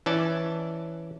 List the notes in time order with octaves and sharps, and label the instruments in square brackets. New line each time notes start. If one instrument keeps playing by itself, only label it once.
[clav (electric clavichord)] E3 C#4 D5 A5